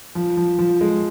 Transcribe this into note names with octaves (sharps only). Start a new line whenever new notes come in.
F3
F3
F3
G#3